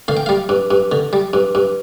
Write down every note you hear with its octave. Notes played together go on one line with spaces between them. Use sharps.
D3 F5
G5
G3 F5
G2
G2
D3
G3
G2
G2